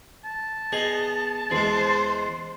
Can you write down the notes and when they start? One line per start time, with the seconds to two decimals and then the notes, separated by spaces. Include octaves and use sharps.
0.24 A5
0.72 B3 G#4 D#5 G#5
1.51 E2 G#3 G#4 C5